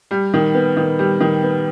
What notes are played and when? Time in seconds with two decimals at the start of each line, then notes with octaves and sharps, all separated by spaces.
0.11 G3
0.33 D#3
0.54 B3
0.77 D#3
0.99 G3
1.20 D#3
1.43 B3